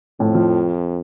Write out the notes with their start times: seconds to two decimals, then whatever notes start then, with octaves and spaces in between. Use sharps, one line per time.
0.20 F2 A2
0.35 F3